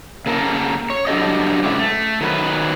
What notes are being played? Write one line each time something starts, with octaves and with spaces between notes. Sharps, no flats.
C#3 A#3 A4 A#4
C#5
F#3 D4 G4 A4 D#5
G#2 C#3 G#3 E4 F#4 G4
A3
D#3 F#3 B4